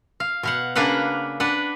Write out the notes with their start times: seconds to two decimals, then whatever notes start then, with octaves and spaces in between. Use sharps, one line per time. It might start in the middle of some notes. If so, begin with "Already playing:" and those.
0.20 F5
0.43 B2 F5 F#5
0.76 C#3 A#3 D4 B4 F5 F#5
1.40 D4 B4 F#5